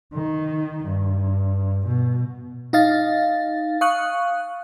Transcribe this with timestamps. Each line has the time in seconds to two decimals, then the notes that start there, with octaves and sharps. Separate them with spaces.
0.13 D#3
0.84 G2
1.86 B2
2.73 D#4 D#5 F5 A6
3.81 F5 C#6 D#6 F#6